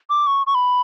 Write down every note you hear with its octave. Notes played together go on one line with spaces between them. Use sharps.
D6
C#6
C#6
B5